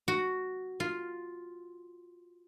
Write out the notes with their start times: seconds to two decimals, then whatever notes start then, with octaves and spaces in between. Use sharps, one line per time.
0.08 F#4
0.80 F4